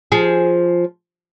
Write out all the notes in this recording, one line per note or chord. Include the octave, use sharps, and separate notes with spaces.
F3 G#4